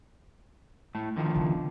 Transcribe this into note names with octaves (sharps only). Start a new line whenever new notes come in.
A2 A3
D3 D#3 F3
C#3 B3